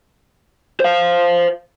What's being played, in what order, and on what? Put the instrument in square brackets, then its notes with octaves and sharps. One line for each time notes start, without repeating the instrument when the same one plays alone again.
[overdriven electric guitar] C5 F5